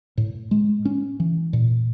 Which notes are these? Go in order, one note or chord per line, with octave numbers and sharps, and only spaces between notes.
A2
G#3
C#4
E3
A#2